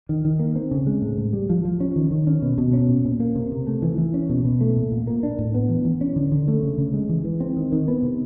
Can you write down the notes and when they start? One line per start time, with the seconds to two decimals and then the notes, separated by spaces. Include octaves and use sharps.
0.09 D#3
0.25 D#3
0.39 A#3
0.55 C4
0.71 C#3
0.87 G#3
1.02 A2
1.17 A2
1.33 G3
1.49 F3
1.65 F3
1.80 C#4
1.96 D#3
2.11 D#3
2.27 C#4
2.42 B2
2.58 B2
2.73 C#4
2.88 A#2
3.05 A#2
3.20 A#3
3.35 C3
3.52 C3
3.67 A3
3.82 E3
3.98 E3
4.14 C#4
4.29 B2
4.45 B2
4.61 A3
4.76 A#2
4.92 A#2
5.07 A#3
5.23 D4
5.38 A2
5.54 B3
5.69 E3
5.85 E3
6.01 C#4
6.16 D3
6.32 D3
6.48 A3
6.63 C#3
6.78 C#3
6.93 G#3
7.09 E3
7.24 E3
7.40 C4
7.56 D#3
7.72 D#3
7.88 B3
8.03 C3